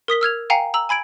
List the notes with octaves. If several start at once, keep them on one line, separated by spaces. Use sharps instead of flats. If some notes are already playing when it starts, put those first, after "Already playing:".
A#4 D#6 B6 G7
E6 F6 G#6 F7
F5 G5 G#5 A#5 C7 C#7
A#5 E6 F#7
G#5 B5 G#6 D7 F#7